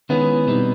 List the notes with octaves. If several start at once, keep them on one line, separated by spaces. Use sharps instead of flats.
D#3 G#3 B3 C#4 E4 G#4
B2 G3 C4 D#4